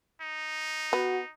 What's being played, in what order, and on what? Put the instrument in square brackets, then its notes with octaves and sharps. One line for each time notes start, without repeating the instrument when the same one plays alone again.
[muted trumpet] D#4
[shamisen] B3 [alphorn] F#4